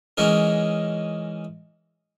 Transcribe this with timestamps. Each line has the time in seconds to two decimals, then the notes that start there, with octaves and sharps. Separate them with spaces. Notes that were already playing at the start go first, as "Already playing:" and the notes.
0.17 E3 G#3 C#4 D#4 A#4